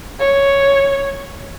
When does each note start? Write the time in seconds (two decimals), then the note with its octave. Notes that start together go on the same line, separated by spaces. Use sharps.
0.20 C#5